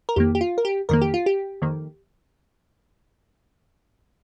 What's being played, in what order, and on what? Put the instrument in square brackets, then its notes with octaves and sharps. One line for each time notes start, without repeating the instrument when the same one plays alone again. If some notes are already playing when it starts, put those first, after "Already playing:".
[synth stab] A#4
F2 D#3 A#3 G4
G4
F4
A#4
G4
F2 D#3 A#3 A#4
G4
F4
G4
F2 D#3 A#3